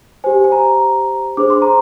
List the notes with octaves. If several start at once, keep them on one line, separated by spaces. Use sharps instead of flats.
G4 C5 G#5
G#5
A#5
D4 G#4 C5 D6
C6
A#5